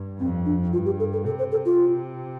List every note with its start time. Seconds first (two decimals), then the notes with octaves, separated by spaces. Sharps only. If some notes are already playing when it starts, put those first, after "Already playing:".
Already playing: G2
0.19 F2 C4
0.46 D4
0.72 G2 F4
0.86 G4
1.00 A4
1.13 A4
1.25 C3 A4
1.39 C5
1.52 A4
1.65 F4